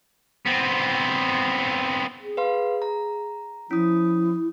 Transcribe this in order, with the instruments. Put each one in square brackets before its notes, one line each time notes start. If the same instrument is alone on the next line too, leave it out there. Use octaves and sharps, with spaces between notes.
[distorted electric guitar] B3 C4
[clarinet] G#4
[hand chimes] B4 F5 C6
A#5
[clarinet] F3 [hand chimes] C#4 D#6 [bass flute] E4